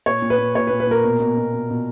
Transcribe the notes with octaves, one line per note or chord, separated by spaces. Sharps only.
A#2 C#5
A#2
B4
A#2
A#2 C#5
A#2 B4
B4
A#2 A#4
B2
B2
B2
B2
B2